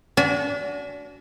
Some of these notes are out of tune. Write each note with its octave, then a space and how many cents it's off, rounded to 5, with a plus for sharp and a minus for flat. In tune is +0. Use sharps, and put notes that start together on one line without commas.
D4 -35 F#4 +0 G#5 -5